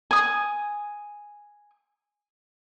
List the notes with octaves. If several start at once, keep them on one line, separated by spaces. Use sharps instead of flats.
G#5 D#6